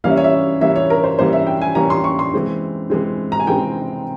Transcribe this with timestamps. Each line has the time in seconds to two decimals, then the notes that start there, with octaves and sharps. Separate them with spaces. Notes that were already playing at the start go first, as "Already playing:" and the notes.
0.04 E3 G3 A#3 C#4 F5
0.10 E5
0.17 C#5
0.24 E5
0.61 E3 G3 A#3 C#4 E5
0.76 C#5
0.90 A#4
1.04 C5
1.19 E3 G3 A#3 C#4 C5
1.33 E5
1.47 G5
1.61 G#5
1.75 E3 G3 A#3 C#4 A#5
1.90 C6
2.04 C#6
2.19 C6
2.34 E3 G#3 C4
2.90 E3 G#3 C4
3.32 A#5
3.40 G#5
3.47 E3 G#3 C4 G5